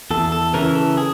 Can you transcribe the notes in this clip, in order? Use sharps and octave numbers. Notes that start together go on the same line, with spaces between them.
E2 A4
A4
C#3 E3 A#4
A4
G#4